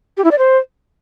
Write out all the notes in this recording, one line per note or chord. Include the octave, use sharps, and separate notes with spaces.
G4
E4
D5
C5